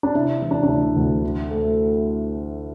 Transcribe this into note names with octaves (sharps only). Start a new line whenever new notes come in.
D4
C3 E4
E3
D4
D4
D2 E4
D2
D3
A3